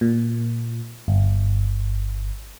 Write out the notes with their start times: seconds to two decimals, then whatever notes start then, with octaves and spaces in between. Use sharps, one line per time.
0.01 A#2
1.08 G1